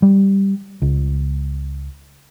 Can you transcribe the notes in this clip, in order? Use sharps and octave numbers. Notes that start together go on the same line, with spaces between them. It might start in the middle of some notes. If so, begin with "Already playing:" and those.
G3
C#2